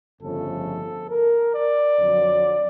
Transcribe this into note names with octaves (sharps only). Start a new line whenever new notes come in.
G1 F2 C#3 F3 A3 A4
A#4
D5
F2 D3 F#3